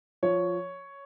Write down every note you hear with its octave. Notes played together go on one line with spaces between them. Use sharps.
F3 C#5